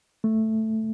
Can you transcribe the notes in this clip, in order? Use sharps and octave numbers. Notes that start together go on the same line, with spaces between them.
A3